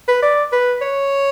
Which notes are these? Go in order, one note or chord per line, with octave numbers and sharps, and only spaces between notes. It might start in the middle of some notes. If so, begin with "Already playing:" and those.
B4
D5
B4
C#5